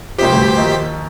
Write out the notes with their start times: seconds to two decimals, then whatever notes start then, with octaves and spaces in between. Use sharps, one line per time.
0.19 C2 C3 F3 G4 C5 B6
0.32 D2 G2
0.56 A#1 D#2